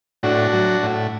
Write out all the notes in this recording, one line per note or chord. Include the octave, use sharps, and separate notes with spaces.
A2 D4 F#4
F#3
A2